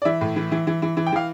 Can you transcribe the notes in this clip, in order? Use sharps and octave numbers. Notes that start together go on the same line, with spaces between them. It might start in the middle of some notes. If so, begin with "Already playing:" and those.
D5
E3 E5
A2
E3
E3
E3
E3
E3
G5
E3 F5